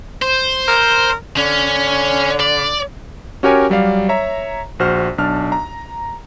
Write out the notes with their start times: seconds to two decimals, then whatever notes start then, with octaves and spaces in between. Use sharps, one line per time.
0.22 C5
0.68 A#4
1.37 D3 C#4
2.40 D5
3.43 C#4 F#4 G4 A#4 C#5 G#5
3.70 F#3 G3 D5 F5
4.09 C#5 E5 A#5
4.79 A#1 F#4 C5 F6
5.18 B1 D4 A5 F6
5.52 A#5